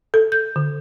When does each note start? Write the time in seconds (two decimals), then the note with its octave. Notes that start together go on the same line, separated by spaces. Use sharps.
0.14 A4
0.32 G6
0.56 D3